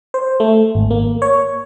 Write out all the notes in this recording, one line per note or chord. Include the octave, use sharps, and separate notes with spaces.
C5
A3
G#1
A#3
C#5